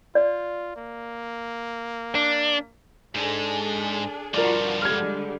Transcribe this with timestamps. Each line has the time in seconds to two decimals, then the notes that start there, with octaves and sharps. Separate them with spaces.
0.15 F4 D5
0.76 A#3
2.15 D4
3.15 G#2 G#3 D4 G#4 A4
4.34 G2 F3 F4 F#4 A#4 D5
4.82 D3 G3 G#3 F6 G#6